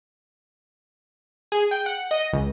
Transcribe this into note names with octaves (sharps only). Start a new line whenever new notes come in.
G#4
G5
F#5
D#5
C#2